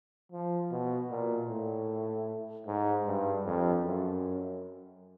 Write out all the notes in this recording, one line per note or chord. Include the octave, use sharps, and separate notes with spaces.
F3
B2
A#2
A2
G#2
G2
F2
F#2